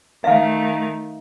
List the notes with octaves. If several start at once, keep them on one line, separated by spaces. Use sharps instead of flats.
D#3 A3 E5 F5